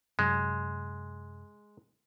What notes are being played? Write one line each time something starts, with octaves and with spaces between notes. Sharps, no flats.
F#2 C3 F#3 G#3